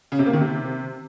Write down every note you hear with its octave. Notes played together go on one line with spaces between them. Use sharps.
C#3
C3
A#3
D#3
C3